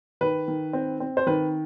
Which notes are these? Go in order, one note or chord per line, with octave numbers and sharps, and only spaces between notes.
D#3 B4
D#3
C4
C4
C5
D#3 B4